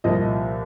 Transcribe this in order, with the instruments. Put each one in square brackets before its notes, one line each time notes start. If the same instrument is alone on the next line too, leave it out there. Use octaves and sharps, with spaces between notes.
[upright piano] C2 A#2 F3 D#5